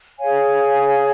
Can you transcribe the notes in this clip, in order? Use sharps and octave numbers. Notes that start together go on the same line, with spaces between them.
G#4 C#5 F5 G#5